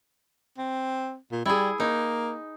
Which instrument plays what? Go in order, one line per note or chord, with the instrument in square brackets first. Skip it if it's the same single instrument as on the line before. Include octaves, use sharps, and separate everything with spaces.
[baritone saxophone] C4
A#2
[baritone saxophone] G3 [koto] E4 G#4
[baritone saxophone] A#3 [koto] D#4